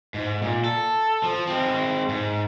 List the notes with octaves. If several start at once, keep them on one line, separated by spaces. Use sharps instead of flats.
G#2
A#2
A4
F3
G#3 C4
G#2